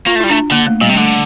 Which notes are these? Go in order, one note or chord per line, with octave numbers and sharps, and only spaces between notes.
A#3 F4
A3
G3 E4
A3 D4
D3 A#3
A3
A#2 G3
C3
D3 A3